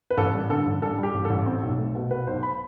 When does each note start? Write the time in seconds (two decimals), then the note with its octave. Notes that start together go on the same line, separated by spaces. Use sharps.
0.10 B4
0.17 A1 A4
0.34 G3
0.49 D3 A4
0.66 A1
0.82 G3 A4
0.98 G3
1.03 G4
1.14 A1
1.25 A4
1.30 A1
1.46 C4
1.63 B1
1.79 A3
1.95 B2
2.11 B2 B4
2.27 B1 C5
2.43 B5